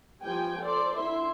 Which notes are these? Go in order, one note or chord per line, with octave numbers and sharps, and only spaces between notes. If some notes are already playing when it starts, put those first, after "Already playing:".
F3 G3 G5 G#5
A4 C5 D5
D3 E4 E5 C6